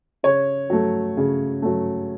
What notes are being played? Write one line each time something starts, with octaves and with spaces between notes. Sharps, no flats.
C#3 C#5
F#3 A3
C#3
F#3 A3